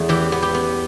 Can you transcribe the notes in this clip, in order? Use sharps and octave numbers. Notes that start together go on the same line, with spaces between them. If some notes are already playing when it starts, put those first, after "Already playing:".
Already playing: E2 A3
E3 G4
B3
G4
B3